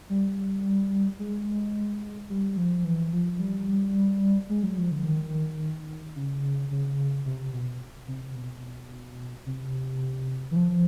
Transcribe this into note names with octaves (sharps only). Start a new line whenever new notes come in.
G3
G#3
G3
F3
E3
F3
G3
G#3
F#3
F3
D3
D#3
C#3
C#3
C3
B2
C3
B2
C3
E3
F3